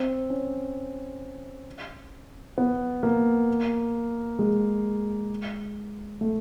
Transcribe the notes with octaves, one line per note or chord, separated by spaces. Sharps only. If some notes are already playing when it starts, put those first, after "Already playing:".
Already playing: C4
C#4
B3
A#3
G#3
A3